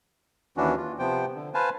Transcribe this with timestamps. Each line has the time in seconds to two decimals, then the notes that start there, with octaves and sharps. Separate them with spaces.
0.57 D#2 E3 C#4 D4 F#4
0.77 F4
0.99 C3 F3 B3 C5 G5
1.35 D3
1.54 B4 C5 F5 G#5 A5